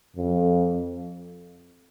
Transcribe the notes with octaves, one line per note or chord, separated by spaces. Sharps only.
F2